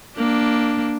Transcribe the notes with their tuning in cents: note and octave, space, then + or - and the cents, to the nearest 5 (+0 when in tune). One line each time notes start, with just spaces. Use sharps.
A#3 +0 D4 +0